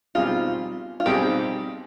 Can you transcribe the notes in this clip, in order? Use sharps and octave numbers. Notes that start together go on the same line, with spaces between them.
B2 G3 C4 D#4 F4 G#4
F4
B2 G3 C4 D#4 G4 G#4